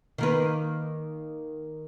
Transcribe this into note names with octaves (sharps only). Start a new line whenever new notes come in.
D#3 A#3 B4